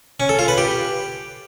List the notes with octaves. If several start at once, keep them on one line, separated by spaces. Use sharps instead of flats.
C#4
A4
F4
B4
G4